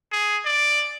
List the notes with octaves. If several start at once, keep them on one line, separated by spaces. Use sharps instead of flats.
G#4
D5